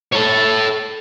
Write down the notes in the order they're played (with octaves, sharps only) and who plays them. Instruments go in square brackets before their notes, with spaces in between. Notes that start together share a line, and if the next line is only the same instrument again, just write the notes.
[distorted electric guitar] A4 C#5